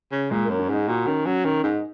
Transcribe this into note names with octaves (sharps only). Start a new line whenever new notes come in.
C#3
A#2 G#3
F#2 A#3
C#4
G#2 D#4
A#2 F#4
D#3 C#4
F#3 C#4
D#3 C#4
G#2 D#4